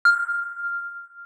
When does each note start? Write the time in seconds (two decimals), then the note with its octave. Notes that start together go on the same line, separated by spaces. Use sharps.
0.05 F6